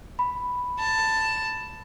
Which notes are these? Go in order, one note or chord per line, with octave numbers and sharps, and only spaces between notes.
B5
A5